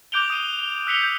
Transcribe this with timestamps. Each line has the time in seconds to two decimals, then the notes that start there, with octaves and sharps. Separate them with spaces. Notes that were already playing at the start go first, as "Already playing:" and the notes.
0.12 D6 F#6 G6 D7 F7 G7
0.30 D#6 D#7
0.59 G7
0.86 E6 F#6 B6 C#7 F7 G7
1.01 G6